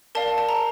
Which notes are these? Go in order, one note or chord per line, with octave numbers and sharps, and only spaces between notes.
A#4 D5 F5 A5
A5
A#5